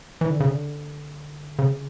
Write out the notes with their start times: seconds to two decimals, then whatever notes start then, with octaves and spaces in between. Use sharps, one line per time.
0.21 E3
0.30 D3
0.40 C#3
0.49 D3
1.59 C#3